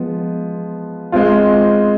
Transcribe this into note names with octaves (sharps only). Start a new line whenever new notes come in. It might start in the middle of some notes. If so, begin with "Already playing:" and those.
Already playing: F3 G#3 B3
G#3 C4 F4